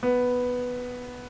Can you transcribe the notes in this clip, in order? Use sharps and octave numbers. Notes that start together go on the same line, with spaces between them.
B3